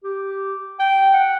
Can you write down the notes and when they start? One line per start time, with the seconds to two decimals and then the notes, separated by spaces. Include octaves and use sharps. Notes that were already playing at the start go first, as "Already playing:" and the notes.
0.04 G4
0.79 G5
1.14 F#5